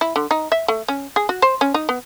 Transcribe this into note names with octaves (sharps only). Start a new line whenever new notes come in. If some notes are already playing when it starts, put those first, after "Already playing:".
E4
D3
D#4
E5
A3
C#4
G#4
F#4
C5
C#4
D#4
B3